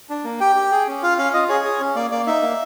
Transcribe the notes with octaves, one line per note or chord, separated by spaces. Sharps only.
D4
A#3
G4 G5
G4
G#4
C#4
F4 F5
C#4 F5
F4 D#5
G#4 C#5
G#4
C#4
A#3 D5
A#3 D5
D#4 E5
A#3